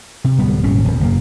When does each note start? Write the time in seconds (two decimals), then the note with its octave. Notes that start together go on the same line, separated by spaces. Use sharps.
0.24 C3
0.38 D1 G3 B3
0.63 D#1 G#1 C#3 C#4
0.84 D#1 E2
1.00 F#1 A#3